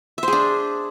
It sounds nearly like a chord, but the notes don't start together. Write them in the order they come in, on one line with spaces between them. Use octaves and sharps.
E5 C5 G#4 D4